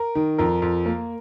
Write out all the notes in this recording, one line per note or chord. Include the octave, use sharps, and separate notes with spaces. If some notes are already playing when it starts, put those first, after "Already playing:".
Already playing: A#4
D#3
F2 A#4
F2
A#3